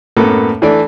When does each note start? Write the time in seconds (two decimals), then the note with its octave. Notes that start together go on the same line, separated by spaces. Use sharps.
0.17 F#2 A2 A#3 B3 A4
0.62 E3 A3 D4 A4 D5